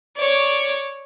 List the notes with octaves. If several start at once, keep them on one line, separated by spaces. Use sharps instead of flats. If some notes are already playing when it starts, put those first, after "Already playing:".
C#5 D5